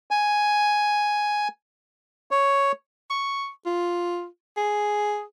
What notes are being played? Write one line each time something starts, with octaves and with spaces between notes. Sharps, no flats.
G#5
C#5
C#6
F4
G#4